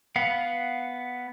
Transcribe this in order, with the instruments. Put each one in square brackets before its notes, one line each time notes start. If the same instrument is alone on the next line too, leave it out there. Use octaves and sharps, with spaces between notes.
[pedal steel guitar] B3 F5 F#5